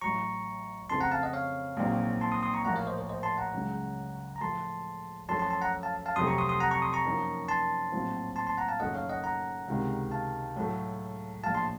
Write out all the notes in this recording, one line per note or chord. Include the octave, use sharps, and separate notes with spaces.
A1 A2 F#3 A#5 C#6
F2 C#3 A3 C4 A5 C6
F#5 A#5
F5 A5
D#5 F#5
C#5 F5
A#1 A#2 F#3 C4 D#4
A5 C6
C6 D#6
C6 D#6
A#5 C#6
A1 A2 F3 A#3 F#5 A#5
C#5 F5
C5 D#5
A#4 C#5
C5 D#5
A5 C6
F#5 A#5
C#2 C#3 F#3
A#5
A2 F3 A3 A5 C6
F#2 F3 A3 A5 C6
A5 C6
A5 C6
F#5 A#5
F5 A5
F5 A5
F2 C3 F#3 A3 C6 D#6
A#5 C#6
C6 D#6
C6 D#6
F#5 A#5
A#5 C#6
C6 D#6
A#5 C#6
F#2 F3 A#3 D#4
A5 C6
A#1 A2 F#3 C4 F4
A5 C6
A5 C6
F#5 A#5
F5 A5
F#1 F#2 D#3 A3 C#4 D#5 F#5
C#5 F5
D#5 F#5
F#5 A#5
C#2 C3 D#3
F5 A5
A2 F#3 A3
A#1 A2 F3 F5 A5
A5 C6